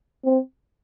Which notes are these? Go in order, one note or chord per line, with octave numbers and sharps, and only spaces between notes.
C4